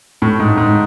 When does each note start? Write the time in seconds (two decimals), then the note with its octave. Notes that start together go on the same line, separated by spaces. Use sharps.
0.22 A2
0.40 G#2
0.57 G#2